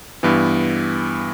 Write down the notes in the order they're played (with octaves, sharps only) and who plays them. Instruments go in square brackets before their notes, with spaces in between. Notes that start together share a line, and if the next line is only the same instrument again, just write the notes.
[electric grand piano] G2 E3 B3